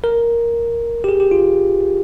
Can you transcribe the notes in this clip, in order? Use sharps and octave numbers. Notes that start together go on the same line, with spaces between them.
A#4
G4
G#4
G4
F4